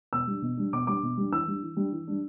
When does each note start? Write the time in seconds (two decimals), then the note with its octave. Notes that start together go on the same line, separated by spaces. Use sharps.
0.13 B2 E6
0.27 G3 D4
0.42 B2
0.57 G3 D4
0.73 B2 D6
0.87 G3 D4 D6
1.03 B2
1.17 G3 D4
1.32 E3 E6
1.47 G3 D4
1.62 E3
1.77 G3 D4
1.92 E3
2.07 G3 D4